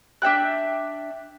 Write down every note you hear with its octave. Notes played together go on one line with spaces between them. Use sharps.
D4 E5 G5 F#6